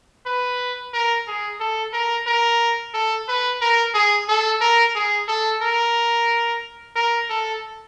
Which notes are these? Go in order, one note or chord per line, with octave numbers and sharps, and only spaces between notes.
B4
A#4
G#4
A4
A#4
A#4
A4
B4
A#4
G#4
A4
A#4
G#4
A4
A#4
A#4
A4